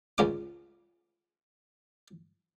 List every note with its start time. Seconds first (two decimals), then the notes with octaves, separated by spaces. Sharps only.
0.18 C#2 C#4 D6